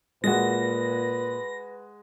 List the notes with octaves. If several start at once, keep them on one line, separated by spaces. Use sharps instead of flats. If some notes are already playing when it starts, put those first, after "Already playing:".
A#2 G#3 F#4 B4 A#6